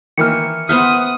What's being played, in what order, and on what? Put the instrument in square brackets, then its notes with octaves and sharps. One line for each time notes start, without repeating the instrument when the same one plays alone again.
[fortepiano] D#3 E3 A#3 [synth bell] F6 C#7
[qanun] B3 C5 E5 [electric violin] F#5 D#6 [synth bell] F6